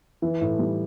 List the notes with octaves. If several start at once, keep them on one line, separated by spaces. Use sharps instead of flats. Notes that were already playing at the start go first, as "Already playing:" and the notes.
E3
A2
G3